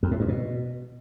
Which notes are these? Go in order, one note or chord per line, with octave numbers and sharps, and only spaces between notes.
F2
A2
G2
B2